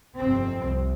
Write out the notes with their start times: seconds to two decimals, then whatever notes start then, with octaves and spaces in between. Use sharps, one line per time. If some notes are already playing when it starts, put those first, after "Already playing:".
0.19 G1 F2 C3 C4
0.63 C2